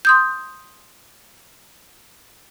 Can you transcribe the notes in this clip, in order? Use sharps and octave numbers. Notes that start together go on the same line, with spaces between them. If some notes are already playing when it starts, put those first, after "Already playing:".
C6 D#6 G6